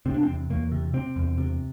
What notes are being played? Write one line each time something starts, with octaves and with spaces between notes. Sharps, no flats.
C3 C4
D4
C4
E2
E2 A#3
C3
C3 C4
E2
C3